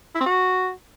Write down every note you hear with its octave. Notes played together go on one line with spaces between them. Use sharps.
E4
C4
F#4